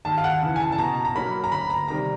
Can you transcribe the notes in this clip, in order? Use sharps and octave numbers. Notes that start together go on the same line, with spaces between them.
D#2 A5
F5
F#5
C#3 E3
G#5
A5
A5
B2 A#5
A#5
F#3 A#3 C#4 B5
A#5
D2 B5
A#5
C3 D#3 G3 A#5